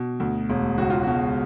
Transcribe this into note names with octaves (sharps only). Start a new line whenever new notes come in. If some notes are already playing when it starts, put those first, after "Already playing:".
Already playing: B2
D2
E1
C#2 F#4
F4
B2 F#4